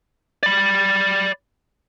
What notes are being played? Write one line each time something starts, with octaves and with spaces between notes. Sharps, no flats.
D5 B5